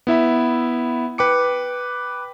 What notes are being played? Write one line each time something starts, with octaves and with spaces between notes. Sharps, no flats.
B3 E4 E5 B5
B4 G5 D6 C#7